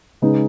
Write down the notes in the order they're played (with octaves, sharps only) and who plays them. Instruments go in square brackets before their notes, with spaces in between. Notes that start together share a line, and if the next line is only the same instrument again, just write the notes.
[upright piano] C#3 G#3 D#4 G#4 B4